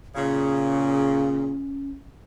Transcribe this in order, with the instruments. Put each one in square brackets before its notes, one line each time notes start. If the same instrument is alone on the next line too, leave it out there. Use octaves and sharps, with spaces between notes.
[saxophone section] A#2 C#3 [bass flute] C#4